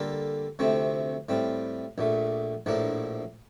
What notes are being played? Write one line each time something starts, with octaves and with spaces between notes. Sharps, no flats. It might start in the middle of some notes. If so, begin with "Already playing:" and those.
Already playing: D3 G3 A#3 F4 A4
D2 C3 F3 A3 C4
A2 G3 C4 F4
A#1 A#2 A3
A#1 A2 F3 A#3 D4